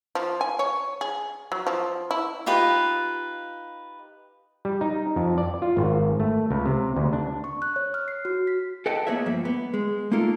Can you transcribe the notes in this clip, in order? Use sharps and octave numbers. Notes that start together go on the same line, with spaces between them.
F3
G#5
C#5
G#4
F#3
F3
E4
D#4 F4 G4 B4
G3
D#4
F2
D5
F4
G#1
A3
C#2
C3
D2
D4
C#6
F#6
C#5
F6
C7
F#4
B6
A4 B4 D#5 F#5 G5 A5
A#3 B3 G#4 B4 C#5 E5
G2 F3 A#3 E5
B3
G#3
A3 A#3 D#4 F4 A4 A#4